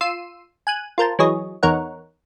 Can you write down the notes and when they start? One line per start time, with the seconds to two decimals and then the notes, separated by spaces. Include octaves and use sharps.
0.01 F4 C6 E6 C7 D#7
0.67 G#5 F#6 D#7
0.98 F4 A#4 C5 A5
1.19 E3 F#3 G#4 C#5 D#5
1.63 E2 D#4 A#4 C#5 F#5